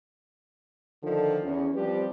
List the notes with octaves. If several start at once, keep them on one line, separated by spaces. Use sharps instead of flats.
D3 D#3 F3 D4 A4
E2 C#4
F3 G3 C4 G4 B4 D5